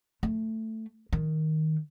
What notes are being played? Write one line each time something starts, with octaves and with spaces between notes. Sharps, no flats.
A3
D#3